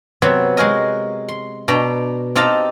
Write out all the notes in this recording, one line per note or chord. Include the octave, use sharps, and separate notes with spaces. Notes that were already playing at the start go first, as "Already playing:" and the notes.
C3 F#3 B3 C4
G#3 F#4 G#4 A#4 D#5
C6
B2 D4 G5 A#5
C4 D#4 G4 F5 A5 A#5